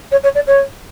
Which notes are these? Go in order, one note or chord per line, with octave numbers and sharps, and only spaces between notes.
C#5
C#5
D5
C#5